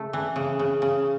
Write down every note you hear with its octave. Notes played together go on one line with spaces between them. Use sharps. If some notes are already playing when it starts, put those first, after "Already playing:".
Already playing: C#3 A3
E3
C#3
C#3
C#3